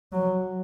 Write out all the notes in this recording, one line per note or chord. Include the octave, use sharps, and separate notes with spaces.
F#3